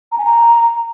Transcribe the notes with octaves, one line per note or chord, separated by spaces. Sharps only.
A#5
G#5
A#5